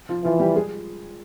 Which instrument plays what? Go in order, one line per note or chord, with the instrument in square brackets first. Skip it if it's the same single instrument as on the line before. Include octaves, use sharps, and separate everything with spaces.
[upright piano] F3 F4
[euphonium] E3 [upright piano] F3 F4
[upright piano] G3 G4
G#3 G#4